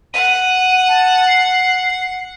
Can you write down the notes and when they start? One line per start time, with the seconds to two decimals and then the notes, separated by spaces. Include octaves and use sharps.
0.14 F#5 D#7
0.88 A5
1.27 C7